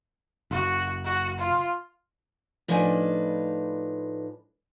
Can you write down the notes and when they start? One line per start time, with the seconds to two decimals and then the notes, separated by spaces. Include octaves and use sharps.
0.51 F#1 F#4
1.05 F#4
1.38 F4
2.68 A2 F3 D4 D#4 B4 G#5